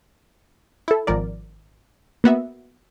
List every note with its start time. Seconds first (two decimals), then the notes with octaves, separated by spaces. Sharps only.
0.88 E4 A4
1.07 G#1 F3 A#4 D5
2.24 A#3 B3 F#4 E5